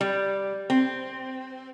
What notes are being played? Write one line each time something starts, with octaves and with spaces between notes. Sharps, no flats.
G3
C4